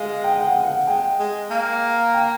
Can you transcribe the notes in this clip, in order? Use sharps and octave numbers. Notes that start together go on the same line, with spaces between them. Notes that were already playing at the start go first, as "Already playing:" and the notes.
Already playing: G#3 F5
G5
F#5
F5
F#5
G#3 G5
G#3
A#3
G5